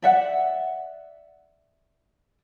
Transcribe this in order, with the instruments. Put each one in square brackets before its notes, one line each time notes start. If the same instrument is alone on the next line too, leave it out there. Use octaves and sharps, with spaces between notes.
[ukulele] D5 E5 F#5